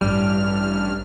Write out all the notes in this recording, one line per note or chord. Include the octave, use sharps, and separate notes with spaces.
A1 G2 G3 F6